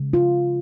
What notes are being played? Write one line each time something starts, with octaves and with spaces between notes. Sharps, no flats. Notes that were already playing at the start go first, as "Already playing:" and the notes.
Already playing: C#3 G#3
F4